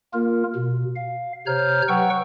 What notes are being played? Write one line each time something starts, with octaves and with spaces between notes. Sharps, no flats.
A#3 F4 A#4
B2
F5
C3 C5 C#5 A#5 F6 G6
F#3 B4 F#5 G5 C#6 E6